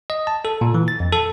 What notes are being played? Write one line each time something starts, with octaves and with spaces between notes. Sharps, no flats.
D#5
A5
A4
A#2
E3
A6
F2
A4